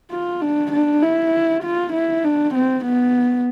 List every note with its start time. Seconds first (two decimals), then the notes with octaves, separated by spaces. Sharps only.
0.11 F4
0.42 D4
0.72 D4
1.02 E4
1.63 F4
1.93 E4
2.24 D4
2.55 C4
2.85 B3